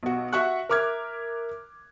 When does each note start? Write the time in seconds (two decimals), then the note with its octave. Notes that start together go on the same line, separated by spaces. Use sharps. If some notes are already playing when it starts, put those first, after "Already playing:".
0.03 B1 F#4
0.33 F#4 E5 F#5 C#6 F#6
0.69 A#4 E5 D6 F6 G#6